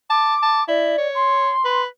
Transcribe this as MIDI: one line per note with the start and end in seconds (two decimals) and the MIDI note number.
0.10 0.35 81
0.10 0.64 86
0.42 0.62 81
0.68 0.94 64
0.68 1.08 74
0.98 1.51 73
1.14 1.84 84
1.65 1.86 71